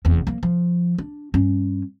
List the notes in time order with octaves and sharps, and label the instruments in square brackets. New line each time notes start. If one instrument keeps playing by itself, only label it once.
[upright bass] F1 E2
F3 A#3
F3
D4
G2 C#4